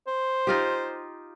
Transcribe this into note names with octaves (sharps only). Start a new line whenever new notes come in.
C5
D#4 F4 G4